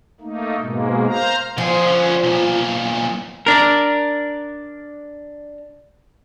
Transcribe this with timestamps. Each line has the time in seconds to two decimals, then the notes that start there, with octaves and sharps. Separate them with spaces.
0.21 A3 A#3 D#4
0.60 G#2 B2 G#3 A#3
1.08 C5 F5 A#5
1.58 F2 F3 G#4
1.86 D3 C#4
2.23 B1 A#2
3.47 D4 A#4